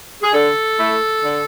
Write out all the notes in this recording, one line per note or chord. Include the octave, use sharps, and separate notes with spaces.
G#4
D3 A4
A3 E4
D3